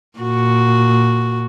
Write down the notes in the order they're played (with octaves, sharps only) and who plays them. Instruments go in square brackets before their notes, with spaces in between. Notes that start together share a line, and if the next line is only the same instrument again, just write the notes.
[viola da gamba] A#2 F#4